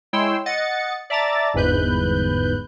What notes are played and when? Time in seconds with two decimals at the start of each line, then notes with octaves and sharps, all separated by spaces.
0.13 G#3 E4 C#5 G5 C6 E6
0.46 D#5 F#5 A6 C#7
1.10 D5 E5 A5 A#5 D6 A6
1.54 G1 E2 G#2 B4 F#6 G6